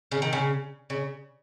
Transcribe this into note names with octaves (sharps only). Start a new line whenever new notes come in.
C#3
D#3
C#3
C#3